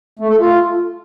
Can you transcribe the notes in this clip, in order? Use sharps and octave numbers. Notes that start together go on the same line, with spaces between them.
A3
A4
F4